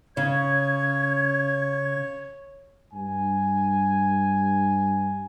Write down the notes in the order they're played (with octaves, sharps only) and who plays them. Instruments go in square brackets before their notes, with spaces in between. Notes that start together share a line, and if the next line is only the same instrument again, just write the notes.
[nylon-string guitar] C#3 [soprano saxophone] C#5 [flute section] G#6
[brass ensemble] G2 G#5